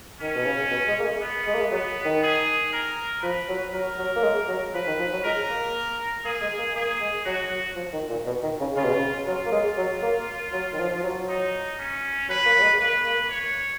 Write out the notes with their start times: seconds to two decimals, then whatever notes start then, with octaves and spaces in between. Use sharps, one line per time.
0.21 D#3 C#4
0.35 B2
0.46 C#3
0.71 B2
0.88 G#3
0.99 A#3
1.05 G#3
1.22 B3
1.47 G#3
1.54 A#3
1.61 G#3
1.72 F#3 B3
2.05 D#3
2.23 G#4
2.73 A#4
3.23 F3 B4
3.48 F#3
3.73 F#3 A#4
3.98 F#3
4.16 A#3
4.23 G#3
4.48 F#3
4.74 F3 B4
4.87 D#3
4.99 F3
5.12 F#3
5.24 G#3 A#4
5.50 A#3
6.25 A#3 G#4
6.41 G#3
6.58 A#3
6.75 A#3 G#4
7.00 G#3
7.25 F#3 F#4
7.51 F#3
7.76 F3
7.93 D#3
8.10 A#2
8.26 B2
8.43 D#3
8.60 C#3
8.76 C#3 F4
8.84 B2
8.94 C#3
9.27 F#3 F4
9.46 A#3
9.52 G#3
9.77 F#3
10.02 A#3
10.53 F#3
10.73 D#3
10.79 F3
10.95 F3
11.03 F#3
11.29 D#4
11.79 C#4
12.29 F#3 B4
12.46 A#3
12.58 F#3
12.62 G#3
12.79 A#3 B4
13.05 A#3
13.30 C#5